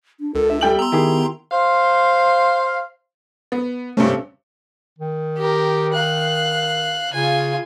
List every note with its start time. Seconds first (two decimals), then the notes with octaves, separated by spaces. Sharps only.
0.20 D4
0.35 C#2 A4 A#4
0.50 D4 E5
0.61 G3 A4 G5 F#7
0.79 B3 A#5 C6 E6
0.92 D#3 E4 G4 G#4
1.51 C5 F5
3.52 B3
3.97 G2 C3 A3 C#4
4.98 D#3
5.37 G4 A#4
5.93 F5 F#6
7.13 C#3 F4 G#5